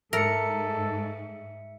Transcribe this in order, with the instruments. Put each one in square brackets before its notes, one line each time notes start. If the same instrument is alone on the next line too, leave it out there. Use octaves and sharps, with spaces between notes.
[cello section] G#2 [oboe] A4 [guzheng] A#4 [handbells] E5 C#7